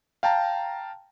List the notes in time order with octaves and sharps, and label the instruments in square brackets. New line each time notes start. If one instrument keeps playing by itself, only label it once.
[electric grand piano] F5 G5 A5 A#5